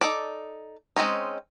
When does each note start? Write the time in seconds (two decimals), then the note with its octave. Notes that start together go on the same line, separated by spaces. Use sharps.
0.01 D#4 A4 D5
0.96 G#3 C4 C#4 D#4